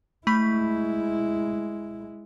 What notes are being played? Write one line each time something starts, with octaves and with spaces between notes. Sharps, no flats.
G#3 A3 E4 B5 B6